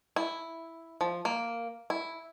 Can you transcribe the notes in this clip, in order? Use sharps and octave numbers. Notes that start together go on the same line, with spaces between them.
E4
F3
A#3
E4